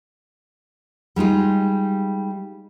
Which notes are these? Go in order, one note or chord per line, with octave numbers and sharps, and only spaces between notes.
G3 G#3 D#4 F4